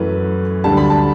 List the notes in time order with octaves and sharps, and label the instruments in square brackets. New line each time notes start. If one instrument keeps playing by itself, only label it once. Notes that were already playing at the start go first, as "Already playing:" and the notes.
Already playing: [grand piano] F#2 E3 A3 B4
D2 D3 G3 A5
B5
A5